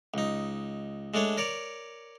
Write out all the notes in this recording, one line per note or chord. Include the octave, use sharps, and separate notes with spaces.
C#2 D#4
G#3 A3 D4 C#5
A#4 C#5 D5